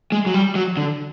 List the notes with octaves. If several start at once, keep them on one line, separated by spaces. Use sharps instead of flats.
G#3
F#3
G3
F#3
D3